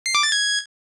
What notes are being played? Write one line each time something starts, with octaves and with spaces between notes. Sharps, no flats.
C7
D6
A6
G#6